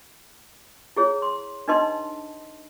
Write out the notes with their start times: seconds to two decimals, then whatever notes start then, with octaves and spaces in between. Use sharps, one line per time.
0.96 E4 G#4 C#5
1.22 C6
1.68 D4 D#4 B4 D#5 A5 C6